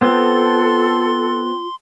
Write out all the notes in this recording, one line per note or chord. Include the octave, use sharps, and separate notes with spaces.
B3 C4 F4 A4 C6